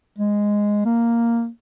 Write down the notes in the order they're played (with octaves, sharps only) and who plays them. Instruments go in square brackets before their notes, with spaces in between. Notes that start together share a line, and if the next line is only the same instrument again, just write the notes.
[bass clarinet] G#3
A#3